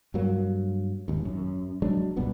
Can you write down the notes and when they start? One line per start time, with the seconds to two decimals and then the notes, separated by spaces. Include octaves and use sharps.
0.14 G2 F#3 A#3
1.08 D#1 G#1 D#2
1.25 F#2
1.82 F#3 G#3 D4
2.16 C2 F#2 A#2 B3